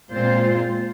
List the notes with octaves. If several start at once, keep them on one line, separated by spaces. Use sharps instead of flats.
A#2 G#3 C4 F4 C5